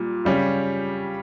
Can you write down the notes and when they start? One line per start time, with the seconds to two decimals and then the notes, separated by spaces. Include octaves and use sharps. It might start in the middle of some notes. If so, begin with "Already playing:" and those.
Already playing: A#2 G3
0.25 C#3 G3 C#4 G4